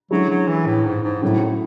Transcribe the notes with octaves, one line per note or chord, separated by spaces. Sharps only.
D3 F#3 G#3 C#4 E4
F#3
E3
A2
G#2
G#2
A2 C#3 F#3 A3 E4